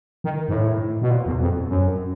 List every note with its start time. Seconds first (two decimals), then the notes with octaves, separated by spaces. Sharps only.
0.24 D#3
0.49 G#2
0.53 A2
1.02 B2
1.11 A#2
1.26 E2
1.40 F2
1.69 F#2